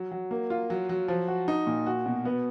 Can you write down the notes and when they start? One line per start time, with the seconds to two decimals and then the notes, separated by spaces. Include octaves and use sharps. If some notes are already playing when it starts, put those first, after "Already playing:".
Already playing: F#3
0.11 F#3
0.31 A#3
0.50 F4
0.70 F#3
0.89 F#3
1.08 F3
1.28 F#4
1.48 D#4
1.67 A#2
1.86 F#4
2.06 B2
2.25 B3